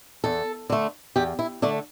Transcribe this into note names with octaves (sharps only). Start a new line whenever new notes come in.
E2 A4
D3 A3
E2 G4
E4
D3 A3 D4